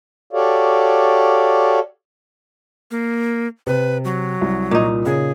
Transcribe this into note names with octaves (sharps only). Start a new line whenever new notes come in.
F#4 G4 A4 C#5 D5 F5
A#3
C3 B4
F#3
C2
A#2 D#4
C#3 G#4